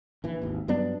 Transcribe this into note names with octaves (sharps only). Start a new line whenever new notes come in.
A#1 E3
G#1 D#2
G2 F#3 B3 D4